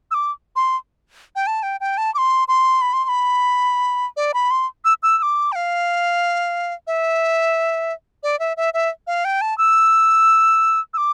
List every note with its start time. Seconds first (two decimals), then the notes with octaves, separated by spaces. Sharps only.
0.11 E6
0.14 D6
0.56 C6
1.36 G5
1.47 A5
1.63 G5
1.81 G5
1.98 A5
2.14 D6
2.18 C6
2.48 C6
2.82 B5
2.93 C6
3.05 C6
3.09 B5
4.17 D5
4.34 B5
4.51 C6
4.85 E6
5.03 E6
5.18 E6
5.23 D6
5.52 G5
5.56 F5
6.87 E5
8.23 D5
8.39 E5
8.57 E5
8.74 E5
9.07 F5
9.25 G5
9.41 A5
9.58 E6
10.94 E6
10.97 D6